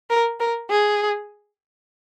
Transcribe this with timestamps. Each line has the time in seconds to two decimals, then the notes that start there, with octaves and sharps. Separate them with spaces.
0.10 A#4
0.40 A#4
0.70 G#4